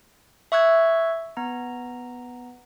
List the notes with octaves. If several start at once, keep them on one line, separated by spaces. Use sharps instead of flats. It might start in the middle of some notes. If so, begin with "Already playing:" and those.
E5 C#6 E6 F#6 G#6
B3 A#5